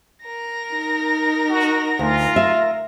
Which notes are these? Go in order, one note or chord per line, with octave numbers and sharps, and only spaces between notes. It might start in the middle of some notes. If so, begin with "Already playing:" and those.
A#4 A#6
D#4
F#4
D2 F4
E5